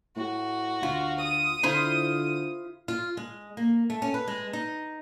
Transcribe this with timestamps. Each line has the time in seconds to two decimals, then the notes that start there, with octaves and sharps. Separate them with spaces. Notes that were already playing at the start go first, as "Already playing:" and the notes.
0.16 A2 F#4
0.83 D2 F4
1.20 D#6
1.63 D3 E4 F4 C5
2.88 F4
3.17 G#3
3.57 A#3
3.90 A3
4.02 C#4
4.14 B4
4.28 G#3
4.53 D#4